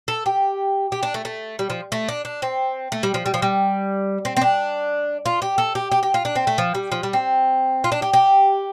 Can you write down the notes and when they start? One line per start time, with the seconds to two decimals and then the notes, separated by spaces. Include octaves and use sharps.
0.08 A4
0.26 G4
0.92 G4
1.03 D4
1.14 A3
1.25 A3
1.59 G3
1.70 F3
1.92 A3
2.09 D4
2.25 D4
2.42 C4
2.92 A3
3.03 G3
3.14 F3
3.26 G3
3.34 F3
3.42 G3
4.25 C4
4.37 C4
4.42 D4
5.26 F4
5.42 G4
5.58 A4
5.75 G4
5.92 G4
6.03 G4
6.14 F4
6.25 D4
6.36 C4
6.47 A3
6.58 F3
6.75 G3
6.92 F3
7.03 G3
7.13 C4
7.84 F4
7.92 D4
8.02 G4
8.13 G4